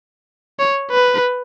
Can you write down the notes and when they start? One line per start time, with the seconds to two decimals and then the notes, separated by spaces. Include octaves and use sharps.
0.59 C#5
0.91 B4